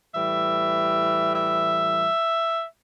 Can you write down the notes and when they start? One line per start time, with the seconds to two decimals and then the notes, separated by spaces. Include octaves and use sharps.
0.13 A2 E3 G3 E5
1.34 E5